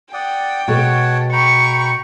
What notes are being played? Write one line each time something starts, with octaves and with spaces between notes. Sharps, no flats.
D5 F#5 G5 D#6
B2 G#3 A4 C#5 F#5 A5
G5 A#5 B5 C#6